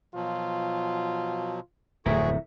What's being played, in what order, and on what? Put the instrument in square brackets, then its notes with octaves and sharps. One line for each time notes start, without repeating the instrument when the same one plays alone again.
[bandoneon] B2 F3 F#3 [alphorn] F4
[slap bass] D1 F2 [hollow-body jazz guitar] A3 E4 A#4 [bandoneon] F#4 G#4